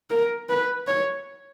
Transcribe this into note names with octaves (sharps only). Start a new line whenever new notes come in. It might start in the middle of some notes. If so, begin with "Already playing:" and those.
A#4
B4
C#5